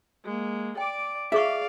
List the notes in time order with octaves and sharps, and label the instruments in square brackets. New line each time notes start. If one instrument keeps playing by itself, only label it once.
[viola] G#3 A#3
[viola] D5 D6 [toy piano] G5
[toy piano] F4 G#4 C#6 [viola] D5 F5 [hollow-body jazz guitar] E5